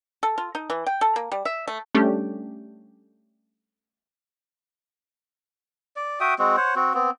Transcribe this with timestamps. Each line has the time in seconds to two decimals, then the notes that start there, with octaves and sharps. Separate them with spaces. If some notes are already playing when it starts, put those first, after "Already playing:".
0.23 A4
0.38 F4
0.55 D#4
0.70 E3
0.86 G5
1.01 A4
1.16 A#3
1.32 G3
1.45 E5
1.68 A3
1.94 G3 A3 C#4 D4 G4
5.96 D5
6.20 F#4 E5 G5 D#6
6.39 G#3 C4 F#4
6.57 C5 C#5 F#5
6.76 C4 F#4
6.94 B3 C4